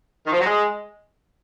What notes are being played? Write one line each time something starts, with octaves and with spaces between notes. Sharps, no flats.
D#3
F3
F#3
G#3